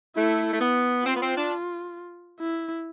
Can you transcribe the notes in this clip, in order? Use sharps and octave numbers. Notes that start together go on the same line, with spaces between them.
A3 E4
A3
B3
C4 F4
B3
C4
D4
E4